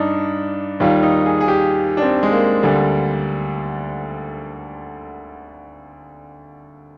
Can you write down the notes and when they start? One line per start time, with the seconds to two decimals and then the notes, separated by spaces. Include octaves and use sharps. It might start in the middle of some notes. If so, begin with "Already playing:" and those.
Already playing: G2 D4 D#4
0.80 D#2 D#3 G3 F4
1.03 D#4
1.26 G#4
1.41 G#4
1.48 G4
1.97 D4
2.02 C4
2.23 G#3
2.32 A#3
2.63 D2 D3 G3